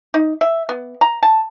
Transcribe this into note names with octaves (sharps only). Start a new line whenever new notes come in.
D#4
E5
B3
A#5
A5